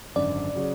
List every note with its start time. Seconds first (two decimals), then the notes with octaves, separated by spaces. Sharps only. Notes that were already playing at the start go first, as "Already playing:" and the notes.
0.16 G#1 F#2 D3 D5
0.55 C#3 F#3 C#4 G#4